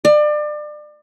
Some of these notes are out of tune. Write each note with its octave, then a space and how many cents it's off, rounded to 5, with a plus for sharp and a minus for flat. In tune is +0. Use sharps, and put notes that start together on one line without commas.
D5 +30